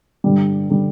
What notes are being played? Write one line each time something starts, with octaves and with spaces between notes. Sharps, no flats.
G2 D3 G3
D3 G3